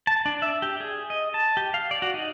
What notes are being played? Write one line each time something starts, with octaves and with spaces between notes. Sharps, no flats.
A5
D4
E5
G4
G#4
D#5
A5
G4
F5
D5
F#4
D#4